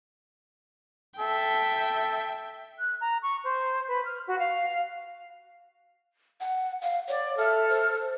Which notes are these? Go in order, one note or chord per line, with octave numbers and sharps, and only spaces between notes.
A4 E5 G5
F#6
A#5
C#6
C5
B4
F6
F#4
F5
F#5
F5
C#5 D5
A4 E5 F6
C5